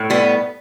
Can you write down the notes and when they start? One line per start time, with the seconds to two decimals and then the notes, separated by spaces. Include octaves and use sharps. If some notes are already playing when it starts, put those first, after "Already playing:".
Already playing: A2
0.10 G3 B3